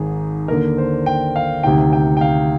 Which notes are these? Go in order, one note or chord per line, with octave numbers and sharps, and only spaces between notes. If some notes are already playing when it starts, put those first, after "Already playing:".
Already playing: G#1 G#2 D#3 G#4
D#2 D3 A#4
C5
G5
F5
D2 C3 D#3 G5
G5
G5
F5